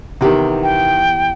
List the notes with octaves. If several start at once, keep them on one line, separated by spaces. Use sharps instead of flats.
C3 D#3 E3 B3 G4
G5